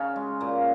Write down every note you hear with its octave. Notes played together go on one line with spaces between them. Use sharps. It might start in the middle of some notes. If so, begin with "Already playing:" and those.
Already playing: C#3 C#4 D#4
G#3
A#2 A#3